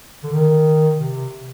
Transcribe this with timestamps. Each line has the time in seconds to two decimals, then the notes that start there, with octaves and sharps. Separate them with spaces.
0.23 D3
0.32 D#3
0.97 C3